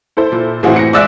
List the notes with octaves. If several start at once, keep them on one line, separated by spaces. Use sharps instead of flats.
E4 A4 C5
A#2
A2 E3 C4 E4 F#4 G#4
A#6 C#7
G#3 D5 E5 D6 E6 F#6